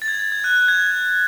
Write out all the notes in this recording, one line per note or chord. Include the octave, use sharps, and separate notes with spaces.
A6
G#6
A6
G#6
F#6
F#6
G#6